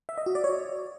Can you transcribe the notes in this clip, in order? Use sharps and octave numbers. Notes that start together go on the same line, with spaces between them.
E5
D#5
F#4
D5
C#5